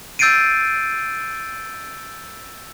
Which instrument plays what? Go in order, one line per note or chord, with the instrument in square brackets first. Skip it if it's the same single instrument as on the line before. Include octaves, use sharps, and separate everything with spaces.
[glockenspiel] E6 G6 A6 C7 D7 D#7